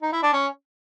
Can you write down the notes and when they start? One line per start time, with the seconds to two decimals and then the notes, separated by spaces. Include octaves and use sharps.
0.02 D#4
0.13 E4
0.23 D4
0.33 C#4